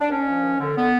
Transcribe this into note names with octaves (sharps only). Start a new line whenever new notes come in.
D4
D#2 C#4
F3
D#2
D3
D3 B3